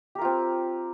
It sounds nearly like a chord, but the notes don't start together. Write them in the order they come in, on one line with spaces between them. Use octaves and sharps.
G4 A#4 F4 C4